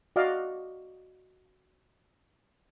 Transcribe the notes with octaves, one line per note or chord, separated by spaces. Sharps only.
F#4 D5 D#5 F5